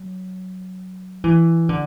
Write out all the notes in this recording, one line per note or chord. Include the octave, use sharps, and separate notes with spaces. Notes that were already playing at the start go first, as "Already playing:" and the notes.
Already playing: F#3
E3
D3